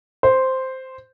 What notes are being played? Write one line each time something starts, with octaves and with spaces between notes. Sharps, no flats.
C5